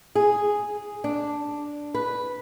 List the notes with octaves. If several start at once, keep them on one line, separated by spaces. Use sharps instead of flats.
G#4
D4
B4